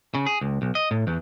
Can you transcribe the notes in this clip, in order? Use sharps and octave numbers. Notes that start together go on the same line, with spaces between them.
C#3
G#4
C#2
B1
D#5
A2
E2